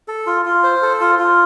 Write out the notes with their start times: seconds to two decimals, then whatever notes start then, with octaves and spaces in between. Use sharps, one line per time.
0.08 A4
0.27 F4
0.45 F4
0.63 C5
0.82 A4
1.00 F4
1.19 F4